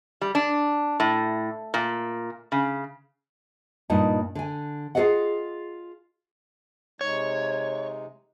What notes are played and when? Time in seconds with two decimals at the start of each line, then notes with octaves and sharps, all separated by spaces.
0.21 G3
0.35 D4
1.00 A2
1.74 A#2
2.52 C#3
3.90 G2 A#2 D#4 D#5 A5
4.35 D3 G#5
4.95 F4 G#4 A4 D5 D#5 F#5
7.01 C3 G#3 D#4 C#5